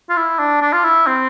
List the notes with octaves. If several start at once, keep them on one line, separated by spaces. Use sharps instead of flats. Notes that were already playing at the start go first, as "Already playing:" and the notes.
F4
E4
D4
D4
F4
E4
C4